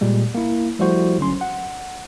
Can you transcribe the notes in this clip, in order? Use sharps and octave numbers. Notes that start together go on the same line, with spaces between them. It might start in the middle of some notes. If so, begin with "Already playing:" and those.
A#2 G3 G#3
A#3 E4
F3 G3 A3 E4 F#4 C5
G1 D3 F#3 C#4 C6
F#5